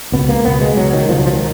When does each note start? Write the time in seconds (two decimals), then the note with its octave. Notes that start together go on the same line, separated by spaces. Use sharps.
0.12 C#2 B2 B3
0.29 A#3
0.45 C#2 B2 B3
0.61 G#3
0.77 C#2 B2 F#3
0.93 D#3
1.09 C#2 B2 F3
1.17 F#3
1.25 F3
1.33 D#3